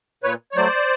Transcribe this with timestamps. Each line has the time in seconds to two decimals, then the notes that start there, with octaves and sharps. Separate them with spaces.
0.23 A#2 B4 C#5
0.52 C#5
0.56 F#3 A3 C5 D5